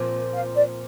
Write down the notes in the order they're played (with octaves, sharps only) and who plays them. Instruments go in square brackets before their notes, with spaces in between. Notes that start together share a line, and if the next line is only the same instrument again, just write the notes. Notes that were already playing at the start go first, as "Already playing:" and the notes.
Already playing: [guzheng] A#2 F3 C4
[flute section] F5
D5